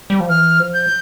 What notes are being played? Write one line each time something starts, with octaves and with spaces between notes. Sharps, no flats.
G3
F3
E3 F6
F3
G6